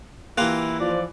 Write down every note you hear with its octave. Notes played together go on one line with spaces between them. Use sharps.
E3 A#3 E4 F4 G4 F#6
F3 D5